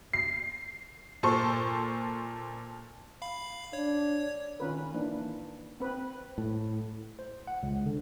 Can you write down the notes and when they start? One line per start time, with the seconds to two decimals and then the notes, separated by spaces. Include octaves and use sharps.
0.13 C7
1.23 A#2 A4 C5 C#6
3.22 F5 B5
3.73 D4 C#5
4.60 D#3 C#4 F4 A#4 B4
4.94 E3 A#3 D4 D#4
5.80 C4 B4
6.38 A2
7.19 C5
7.47 F#5
7.63 C#2
7.86 D3